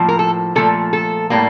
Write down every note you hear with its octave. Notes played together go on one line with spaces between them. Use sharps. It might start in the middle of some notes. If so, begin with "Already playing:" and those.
Already playing: A2 F3 A#3
A#4
A4
A#2 F3 A3 A4
A4
A2 G3 A#3